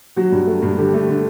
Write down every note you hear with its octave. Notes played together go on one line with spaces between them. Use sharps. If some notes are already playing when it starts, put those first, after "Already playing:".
F#3 F#4
G2
A3
G2
D3 G4
A3
D3